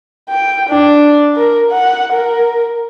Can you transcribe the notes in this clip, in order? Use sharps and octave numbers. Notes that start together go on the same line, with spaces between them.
G5
D4
A#4
F#5
A#4